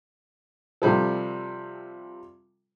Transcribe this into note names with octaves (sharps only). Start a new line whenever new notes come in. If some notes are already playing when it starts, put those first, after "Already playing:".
C3 F3 G3 A4